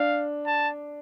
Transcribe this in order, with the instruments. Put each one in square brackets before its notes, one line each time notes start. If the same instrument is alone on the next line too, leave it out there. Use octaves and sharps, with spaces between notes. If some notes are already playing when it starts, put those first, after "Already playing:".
Already playing: [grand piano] D4 [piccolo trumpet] F5
[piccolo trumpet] A5